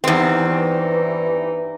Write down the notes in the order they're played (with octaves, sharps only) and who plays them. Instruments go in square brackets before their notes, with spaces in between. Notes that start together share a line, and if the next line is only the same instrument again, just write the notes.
[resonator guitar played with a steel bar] E2 C4 [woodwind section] G2 E3 D#4